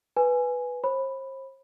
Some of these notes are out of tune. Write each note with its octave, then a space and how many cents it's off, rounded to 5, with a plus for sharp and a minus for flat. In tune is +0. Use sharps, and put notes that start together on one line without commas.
B4 +0 G#5 +0
C5 +40 B5 +0